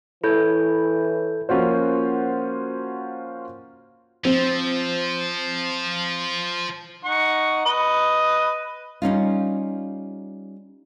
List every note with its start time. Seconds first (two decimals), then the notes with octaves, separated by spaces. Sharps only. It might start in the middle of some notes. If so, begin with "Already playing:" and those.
0.24 E3 E4 A4 C#5 G6
1.49 F3 A#3 C#4 F4 F#4 C5
4.25 F3 C4
7.05 D#4 F#5 C#6
7.65 B4 D#5
9.02 G3 C#4 D#4 F4